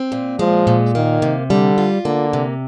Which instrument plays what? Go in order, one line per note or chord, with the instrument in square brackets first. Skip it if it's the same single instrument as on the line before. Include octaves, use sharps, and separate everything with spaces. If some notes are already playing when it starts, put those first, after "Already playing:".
Already playing: [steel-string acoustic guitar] C4
A#2
[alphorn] F3 [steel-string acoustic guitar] G#3
[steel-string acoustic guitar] A#2
[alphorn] D#3 [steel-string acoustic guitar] A#3
[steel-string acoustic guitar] C3
[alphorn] D3 [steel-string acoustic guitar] G3
[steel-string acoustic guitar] F4
[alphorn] D3 [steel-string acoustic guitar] A#3
[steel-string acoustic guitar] C3